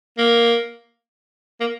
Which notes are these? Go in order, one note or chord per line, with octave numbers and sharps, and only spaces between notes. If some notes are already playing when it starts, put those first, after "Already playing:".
A#3
A#3